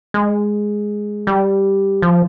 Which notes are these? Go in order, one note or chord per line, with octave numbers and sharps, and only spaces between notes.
G#3
G3
F3